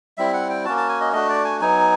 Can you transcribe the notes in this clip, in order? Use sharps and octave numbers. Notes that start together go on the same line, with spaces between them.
G3 C4 E4 E5
F#5
G5
A#3 C#4 F#4 A5
A5
G#5
D#5
A3 D4 F#4 D#5
D5
G#5
F#3 B3 D#4 G#5